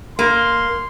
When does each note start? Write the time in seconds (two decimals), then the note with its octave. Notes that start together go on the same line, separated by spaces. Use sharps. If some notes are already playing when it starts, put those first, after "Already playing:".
0.19 A#3 C6